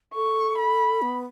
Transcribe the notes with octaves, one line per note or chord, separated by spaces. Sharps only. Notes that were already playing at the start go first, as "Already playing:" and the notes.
A4 C#6
B5
B3